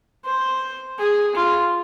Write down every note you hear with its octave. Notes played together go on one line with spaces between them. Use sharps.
C5
G#4
F4